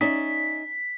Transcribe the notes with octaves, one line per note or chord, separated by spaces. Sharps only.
C#4 D#4 D5 E5 B6